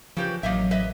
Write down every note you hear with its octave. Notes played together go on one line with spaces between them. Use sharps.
C#3 F3 G4 B4
A1 F#3 A#3 D#5 E5
B4 D#5 E5